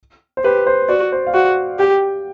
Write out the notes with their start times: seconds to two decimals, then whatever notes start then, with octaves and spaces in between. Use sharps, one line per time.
0.37 C5
0.44 G4 B4
0.67 C5
0.89 F#4 D5
1.12 C5
1.27 F5
1.34 F#4 F#5
1.79 G4 G5